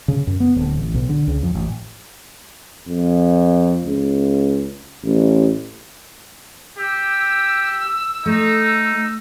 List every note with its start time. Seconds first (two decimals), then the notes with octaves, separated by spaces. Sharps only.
0.08 C#3
0.27 F#2
0.40 B3
0.56 D1
0.78 A1
0.94 B1
1.09 D3
1.28 C#2
1.43 F2
1.55 A1
2.88 F2
3.86 C#2
5.04 A1
6.78 G4 E6
8.26 A3 D#4